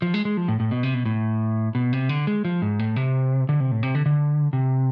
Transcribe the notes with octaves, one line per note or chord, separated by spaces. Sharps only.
F3
G#3
G#3
F3
A2
A2
B2
C3
B2
A2
B2
C3
D3
G#3
F3
G#2
A2
C3
D3
C3
A2
C3
D3
D3
C3